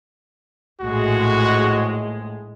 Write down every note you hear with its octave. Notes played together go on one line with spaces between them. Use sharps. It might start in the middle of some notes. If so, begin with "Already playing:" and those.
A#1 A2 G#3 F#4